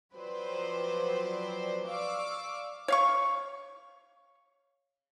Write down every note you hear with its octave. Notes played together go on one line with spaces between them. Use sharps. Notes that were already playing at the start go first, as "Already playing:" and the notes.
F3 F#3 C4 B4 C5 D5
D5 F5 C#6 D6 E6
C#5 F5 C#6